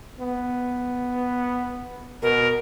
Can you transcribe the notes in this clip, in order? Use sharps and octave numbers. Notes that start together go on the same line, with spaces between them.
B3
B2 A#4